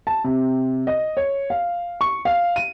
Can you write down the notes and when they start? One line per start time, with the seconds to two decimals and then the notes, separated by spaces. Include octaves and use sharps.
0.07 A5
0.24 C3
0.87 D#5
1.17 C#5
1.50 F5
2.01 C#6
2.25 F5
2.56 D#7